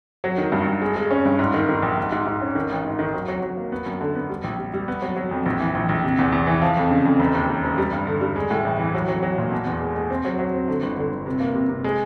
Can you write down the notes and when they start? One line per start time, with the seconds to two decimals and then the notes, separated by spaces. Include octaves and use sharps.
0.24 F#3
0.38 D#3
0.52 G2
0.67 G2
0.82 G#3
0.96 G#3
1.11 C#4
1.25 G2
1.39 G#2
1.54 D#3
1.69 D#3
1.82 A#1
1.97 G#2
2.12 G#2
2.26 G#2
2.41 C#4
2.55 D#3
2.70 A1
2.84 G#2
2.99 D#3
3.14 F#3
3.28 F#3
3.42 F#3
3.57 A#3
3.72 B3
3.86 F#2
4.01 D3
4.15 B3
4.30 G3
4.44 A#1
4.58 G3
4.74 G3
4.88 B3
5.02 F#3
5.16 F#3
5.31 F2
5.46 A#1
5.60 E3
5.75 A#1
5.89 A#1
6.04 C3
6.19 E2
6.32 E2
6.47 E3
6.62 F3
6.77 F2
6.91 C#3
7.05 F2
7.20 E1
7.35 D#2
7.49 E1
7.64 E1
7.78 G3
7.93 G2
8.07 D3
8.21 G3
8.36 G#3
8.51 A2
8.65 A1
8.79 E3
8.95 F#3
9.08 F#3
9.23 F#3
9.38 A#2
9.52 B2
9.67 E2
9.81 G#3
9.96 G#3
10.10 C4
10.25 F#3
10.39 F#3
10.53 C4
10.68 D3
10.83 G1
10.97 D3
11.12 G1
11.26 C3
11.40 A#3
11.55 C3
11.69 C3
11.84 G#3